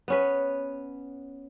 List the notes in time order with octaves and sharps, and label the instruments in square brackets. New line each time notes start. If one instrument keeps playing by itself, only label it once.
[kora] B3 C#4 B4